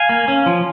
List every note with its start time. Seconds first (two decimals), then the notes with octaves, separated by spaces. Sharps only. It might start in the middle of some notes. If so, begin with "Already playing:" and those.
Already playing: F5 G#5
0.09 A#3
0.28 C#4
0.46 F3